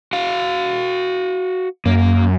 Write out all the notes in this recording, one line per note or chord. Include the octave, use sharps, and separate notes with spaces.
F#4 F5
F#2 A#3